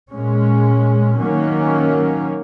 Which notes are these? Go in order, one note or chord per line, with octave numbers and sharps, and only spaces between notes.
A#2 G#3 C#4
D#3 F#3 A#3 C#4